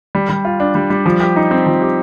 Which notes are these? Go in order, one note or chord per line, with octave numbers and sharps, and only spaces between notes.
G3
G3
F4
D4
G3
G3
F3
G4
D#4
C4
F3
G4